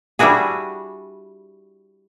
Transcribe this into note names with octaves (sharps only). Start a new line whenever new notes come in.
G3 D4 E4 F#4 G#4